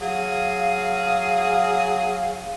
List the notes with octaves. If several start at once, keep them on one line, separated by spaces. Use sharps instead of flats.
F#3 G#4 F5